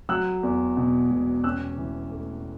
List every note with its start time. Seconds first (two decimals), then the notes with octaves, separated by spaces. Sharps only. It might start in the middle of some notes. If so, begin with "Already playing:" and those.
0.09 F#3 E6 F#6
0.43 E2
0.77 B2
1.10 E1
1.44 C#4 E6 F#6
1.78 E3
2.12 A3